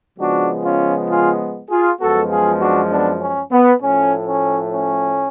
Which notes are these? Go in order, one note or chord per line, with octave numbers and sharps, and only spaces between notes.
C#3 F3 G#3 B3 D4 F#4
C#4 F4
F4 G#4
F4 G#4
F#2 F3 G#3 B3 F#4 A4
F4 G#4
D4 F#4
B3 D4
C#4
B3
A2 F3 A3 C#4
C#4
C#4